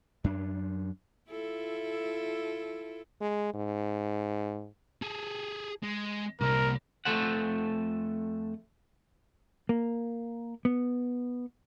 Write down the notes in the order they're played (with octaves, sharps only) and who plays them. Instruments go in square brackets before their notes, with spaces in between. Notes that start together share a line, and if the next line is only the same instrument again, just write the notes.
[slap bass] F#2 D4
[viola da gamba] E4 F4 A4
[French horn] G#3
G#2
[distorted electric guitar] G#4 A4
G#3
[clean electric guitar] C2 [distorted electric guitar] A#3 D4 [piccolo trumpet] A#4
[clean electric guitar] F2 A3 A4 C5 F#5
[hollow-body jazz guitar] A#3
B3